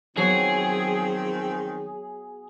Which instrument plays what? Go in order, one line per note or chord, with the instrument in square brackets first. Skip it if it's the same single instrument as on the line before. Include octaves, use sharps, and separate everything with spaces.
[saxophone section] D#3 F3 C4 [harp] F#3 B3 C#5 [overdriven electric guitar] G#4